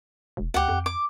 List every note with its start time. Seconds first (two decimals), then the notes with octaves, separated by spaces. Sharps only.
0.37 E1
0.54 D2 G4 F#5
0.68 F2
0.86 D6